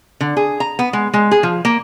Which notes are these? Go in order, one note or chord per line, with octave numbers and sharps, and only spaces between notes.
D3
G#4
A#5
B3
G#3
G#3
G#4
F3
A#3